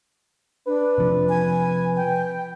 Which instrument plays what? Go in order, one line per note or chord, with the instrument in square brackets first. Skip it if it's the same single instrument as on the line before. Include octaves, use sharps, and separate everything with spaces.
[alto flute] D4 [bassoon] B4
[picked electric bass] C3 F3
[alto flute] G#5
G5